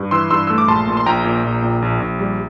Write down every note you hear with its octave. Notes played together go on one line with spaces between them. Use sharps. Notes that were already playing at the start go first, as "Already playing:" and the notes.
Already playing: G2
E3 C6 E6
G2 C6 E6
A3 E6
D6
A#1 A5 C6
A#2
C6
A#1 G5 A#5
A#2
A#1
A#2
A#1
A#1
G3